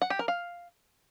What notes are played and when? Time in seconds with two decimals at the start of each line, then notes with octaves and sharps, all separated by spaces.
0.02 F#5
0.10 G4
0.19 A#4
0.28 F5